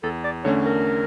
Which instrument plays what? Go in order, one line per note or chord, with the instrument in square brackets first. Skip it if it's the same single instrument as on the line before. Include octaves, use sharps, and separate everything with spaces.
[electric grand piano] E2 [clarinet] A4
[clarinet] D5
[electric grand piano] D3 A3 C#4 [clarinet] C#5
[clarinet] A#4